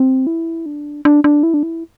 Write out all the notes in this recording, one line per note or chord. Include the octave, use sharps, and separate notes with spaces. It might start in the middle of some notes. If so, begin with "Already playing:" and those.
Already playing: C4
E4
D4
D4
D4
E4
D4
E4